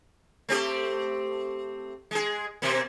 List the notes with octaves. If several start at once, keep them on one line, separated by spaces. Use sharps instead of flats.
A3 C4 G4
G#3 G#4
B2 A#3